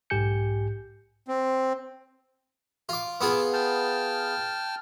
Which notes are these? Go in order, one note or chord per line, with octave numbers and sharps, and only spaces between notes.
B1 G#2 G4 G#5 G6 C#7
C4
F4 D6
B3 F4 G#4 D6 E6
G5 A5 F6